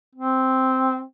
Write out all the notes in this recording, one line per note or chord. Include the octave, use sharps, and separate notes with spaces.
C4